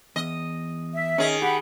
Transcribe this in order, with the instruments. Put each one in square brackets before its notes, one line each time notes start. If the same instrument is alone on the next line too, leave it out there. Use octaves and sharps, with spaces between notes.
[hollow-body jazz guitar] E2 [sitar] D#5
[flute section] E5
[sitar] D#3 G#4 [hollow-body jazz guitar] C#4 D#5
[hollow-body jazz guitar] G4 [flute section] F#5 B5